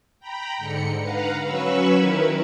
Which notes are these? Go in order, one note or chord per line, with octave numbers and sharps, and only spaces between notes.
G5 A#5 B5
G#2 D3 C#7
B4 F5 F#5 A#5
F#3 C#4 B4 B5 C#6 E6
D#3 E4 A#4 B4